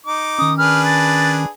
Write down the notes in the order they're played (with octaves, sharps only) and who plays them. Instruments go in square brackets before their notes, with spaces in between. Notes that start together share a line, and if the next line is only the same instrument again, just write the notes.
[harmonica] D#4 D6
[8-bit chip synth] D#3 C#4 [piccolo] D#6
[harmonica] D4 G#4 B4 [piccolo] F6
[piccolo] A6